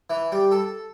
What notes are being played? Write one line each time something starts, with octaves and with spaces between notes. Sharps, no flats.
E3
G3
A4